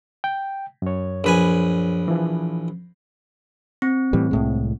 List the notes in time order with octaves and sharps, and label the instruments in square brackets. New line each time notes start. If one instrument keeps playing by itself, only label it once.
[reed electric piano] G5
F#2 C#5
[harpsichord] A#1 B4 G#5
[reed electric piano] E3 F3
[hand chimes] C4
[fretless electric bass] A2 E3 G3
C2 A2 G#3